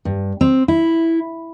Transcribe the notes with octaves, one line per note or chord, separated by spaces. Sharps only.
G2
C4
E4